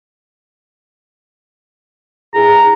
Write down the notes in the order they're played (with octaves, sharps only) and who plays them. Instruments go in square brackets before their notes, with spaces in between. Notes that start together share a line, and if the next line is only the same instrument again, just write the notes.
[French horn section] G2 E4 G#4 [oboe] A#5